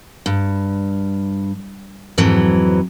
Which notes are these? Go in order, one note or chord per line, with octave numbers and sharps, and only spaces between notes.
G2
F2 G#2 E3 F#3